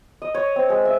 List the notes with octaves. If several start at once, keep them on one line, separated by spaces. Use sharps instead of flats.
D#5
C#5
C4
G#3
E5